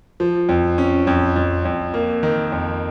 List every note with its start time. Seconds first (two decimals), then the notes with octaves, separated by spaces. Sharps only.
0.20 F3
0.49 F2
0.78 C#4
1.07 F2
1.36 F2
1.65 F2
1.94 A#3
2.23 D#3
2.52 F2